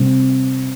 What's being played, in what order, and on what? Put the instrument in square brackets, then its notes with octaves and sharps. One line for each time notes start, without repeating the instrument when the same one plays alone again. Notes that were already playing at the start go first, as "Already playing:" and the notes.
Already playing: [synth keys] C3 G3 C4